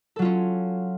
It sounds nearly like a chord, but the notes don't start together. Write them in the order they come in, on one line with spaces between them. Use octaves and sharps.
A4 F#3 F4 C#4